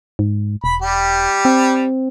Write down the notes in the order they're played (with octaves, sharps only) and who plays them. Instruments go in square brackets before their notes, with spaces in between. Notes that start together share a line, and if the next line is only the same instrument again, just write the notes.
[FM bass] G#2
[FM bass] E1 [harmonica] B5
[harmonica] G3 G4
[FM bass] C4